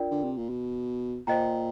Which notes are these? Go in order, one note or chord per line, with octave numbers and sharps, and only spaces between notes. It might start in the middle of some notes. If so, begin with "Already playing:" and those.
Already playing: D4 F4 A#4 D5 G5
D3
C3
A#2
B2
A#2 C5 D#5 G5 A#5